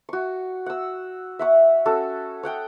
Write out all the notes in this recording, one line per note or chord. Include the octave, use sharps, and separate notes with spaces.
F#4 C#6
F#5 E6
E5 F#5 C#6
C#4 F#4 A4
C#5 F#5 G5 D#6